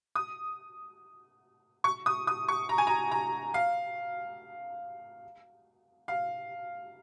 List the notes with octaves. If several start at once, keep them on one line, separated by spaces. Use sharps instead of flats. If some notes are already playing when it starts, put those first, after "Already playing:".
D#6
C#6
D#6
D#6
C#6
A#5
G#5
A#5
A#5
F5
F5